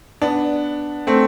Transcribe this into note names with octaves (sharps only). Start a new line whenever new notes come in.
B3 D4
A3 C4